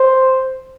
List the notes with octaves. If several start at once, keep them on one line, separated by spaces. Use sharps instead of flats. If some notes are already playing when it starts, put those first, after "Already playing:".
Already playing: C5